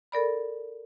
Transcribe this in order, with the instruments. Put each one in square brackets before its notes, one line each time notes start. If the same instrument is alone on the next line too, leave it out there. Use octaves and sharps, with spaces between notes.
[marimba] A4 A#4 D5 B5